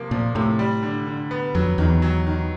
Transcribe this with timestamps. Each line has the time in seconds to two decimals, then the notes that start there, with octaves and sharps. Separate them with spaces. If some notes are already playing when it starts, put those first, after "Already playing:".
Already playing: C3 F3 A#3
0.11 A#2 F3
0.35 A2 C3
0.59 G3
0.83 D3
1.07 D3
1.31 B3
1.55 F2 F#3
1.78 E2 D#3
2.02 F#3
2.27 D#3